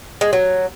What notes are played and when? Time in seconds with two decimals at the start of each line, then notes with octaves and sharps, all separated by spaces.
0.21 G#3
0.33 F#3